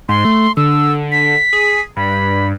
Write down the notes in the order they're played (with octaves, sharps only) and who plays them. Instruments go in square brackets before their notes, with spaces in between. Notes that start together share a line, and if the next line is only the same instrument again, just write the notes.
[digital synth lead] G#2 [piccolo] C6
[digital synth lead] A3
[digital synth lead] D3 [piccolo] E6
[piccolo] B6
[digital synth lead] G#4
[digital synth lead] G2 [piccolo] B5